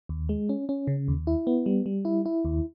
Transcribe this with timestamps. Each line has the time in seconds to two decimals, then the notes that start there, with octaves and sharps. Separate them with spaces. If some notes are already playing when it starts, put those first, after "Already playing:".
0.09 D#2
0.29 G#3
0.49 C#4
0.69 C#4
0.87 C#3
1.08 D#2
1.27 E4
1.47 B3
1.66 G3
1.86 G3
2.05 E4
2.26 E4
2.45 D#2